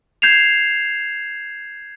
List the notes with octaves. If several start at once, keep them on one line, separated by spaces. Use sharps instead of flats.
G6 G#6 C7 E7 F7